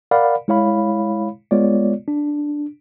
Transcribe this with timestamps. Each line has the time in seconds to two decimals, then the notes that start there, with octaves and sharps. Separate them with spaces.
0.11 A#4 D5 F5 F#5 B5
0.48 G#3 E4 C#5 F5 B5
1.51 G#3 B3 F4 C#5 D5
2.08 D4